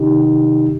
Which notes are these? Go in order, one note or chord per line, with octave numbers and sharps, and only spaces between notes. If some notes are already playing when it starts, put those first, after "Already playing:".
Already playing: C3 D#3 D#4 G4